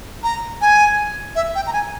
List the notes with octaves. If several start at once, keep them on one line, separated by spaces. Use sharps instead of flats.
A#5
G#5
E5
G5
A#5
G#5